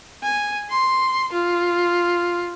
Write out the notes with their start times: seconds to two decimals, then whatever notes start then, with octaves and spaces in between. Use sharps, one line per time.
0.23 G#5
0.70 C6
1.32 F4